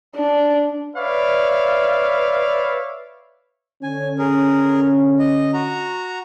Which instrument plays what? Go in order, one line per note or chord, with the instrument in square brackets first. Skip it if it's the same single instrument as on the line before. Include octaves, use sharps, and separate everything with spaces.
[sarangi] D4
[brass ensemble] B4 C#5 D5 E5 F5
[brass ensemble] D3 C#4 [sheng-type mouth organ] G#5
[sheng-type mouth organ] G#4 A#4
D#5
F#4 A#5